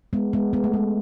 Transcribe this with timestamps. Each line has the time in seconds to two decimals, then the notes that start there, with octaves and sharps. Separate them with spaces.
0.13 G#3 B3
0.33 G#3 B3
0.53 G#3 B3
0.64 A3
0.73 G#3